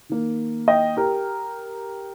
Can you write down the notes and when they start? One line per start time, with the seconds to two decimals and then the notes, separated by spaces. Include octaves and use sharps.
0.09 D#3 A#3
0.68 D#5 G5
0.97 G4 A#4